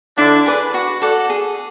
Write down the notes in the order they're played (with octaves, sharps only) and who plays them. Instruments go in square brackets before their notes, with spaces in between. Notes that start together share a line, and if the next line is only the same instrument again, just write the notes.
[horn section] D3 D4 [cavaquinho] E4
[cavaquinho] G#4 B4 D5
F#4
A4 D5 F#5
G#4